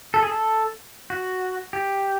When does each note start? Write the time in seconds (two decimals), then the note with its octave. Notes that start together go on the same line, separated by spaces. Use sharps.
0.14 A4
0.23 G#4
0.30 A4
1.10 F#4
1.73 G4